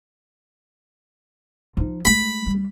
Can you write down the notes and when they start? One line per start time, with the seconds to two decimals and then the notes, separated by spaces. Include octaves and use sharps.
1.77 F3 D#4
2.05 G#3 A3 B5
2.46 G3